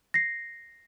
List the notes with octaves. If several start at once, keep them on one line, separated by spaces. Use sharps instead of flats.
A#6 C7